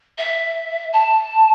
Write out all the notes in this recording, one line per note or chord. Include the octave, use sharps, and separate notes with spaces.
E5
A5